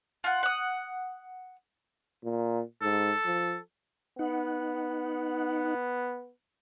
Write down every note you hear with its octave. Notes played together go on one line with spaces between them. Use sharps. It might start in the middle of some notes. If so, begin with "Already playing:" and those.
F4 F#5
F#5 D#6
A#2
G#2 A4
F3
B3 D#4 F#5